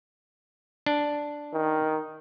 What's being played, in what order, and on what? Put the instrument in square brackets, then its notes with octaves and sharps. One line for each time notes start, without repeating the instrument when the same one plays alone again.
[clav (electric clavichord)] D4
[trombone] D#3